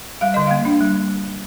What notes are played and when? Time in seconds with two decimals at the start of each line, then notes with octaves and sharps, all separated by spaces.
0.21 G3 F5
0.34 D3 D#5
0.47 A#3 F5
0.65 D4
0.80 G3